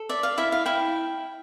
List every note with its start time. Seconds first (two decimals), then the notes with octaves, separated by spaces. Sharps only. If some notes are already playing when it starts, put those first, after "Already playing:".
Already playing: A4
0.09 D5 E5
0.23 F5
0.38 E4 E5
0.52 F5
0.66 E4 G5